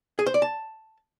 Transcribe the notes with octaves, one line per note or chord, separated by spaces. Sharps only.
G#4
C5
D5
A5